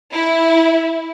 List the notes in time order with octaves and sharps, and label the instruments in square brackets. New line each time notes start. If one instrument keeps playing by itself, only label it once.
[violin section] E4